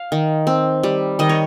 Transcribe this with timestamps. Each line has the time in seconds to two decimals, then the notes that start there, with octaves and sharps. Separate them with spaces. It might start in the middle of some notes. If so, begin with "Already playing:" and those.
Already playing: F5
0.12 D#3
0.47 C4
0.83 G3
1.19 D#3 D#5
1.29 C#5